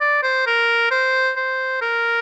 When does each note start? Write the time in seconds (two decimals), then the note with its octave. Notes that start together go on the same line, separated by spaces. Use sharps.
0.01 D5
0.23 C5
0.46 A#4
0.91 C5
1.36 C5
1.81 A#4